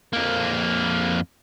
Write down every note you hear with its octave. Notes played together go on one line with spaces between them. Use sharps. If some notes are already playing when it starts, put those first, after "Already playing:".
F2 A#3